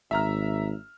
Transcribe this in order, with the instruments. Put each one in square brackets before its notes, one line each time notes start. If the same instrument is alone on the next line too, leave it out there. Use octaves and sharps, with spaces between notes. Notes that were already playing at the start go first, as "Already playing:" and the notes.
[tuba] G#1 [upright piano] E5 A#5 F6